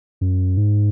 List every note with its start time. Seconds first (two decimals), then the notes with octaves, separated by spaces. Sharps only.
0.21 F#2
0.57 G#2